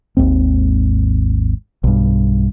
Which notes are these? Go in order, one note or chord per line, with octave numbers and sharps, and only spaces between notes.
G#1 D#2 G#2 C4
B1 G2